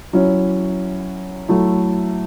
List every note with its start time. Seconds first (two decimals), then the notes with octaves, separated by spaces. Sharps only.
0.13 F#3 C#4 E4
1.48 F#3 A3 E4